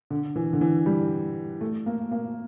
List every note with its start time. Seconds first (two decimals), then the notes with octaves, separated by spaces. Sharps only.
0.10 D3
0.36 E3
0.53 D3
0.61 E3
0.86 G3
1.61 A3
1.86 A#3
2.11 A#3